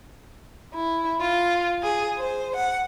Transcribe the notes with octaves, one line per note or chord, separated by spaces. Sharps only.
E4
F4
G#4
C5
F#5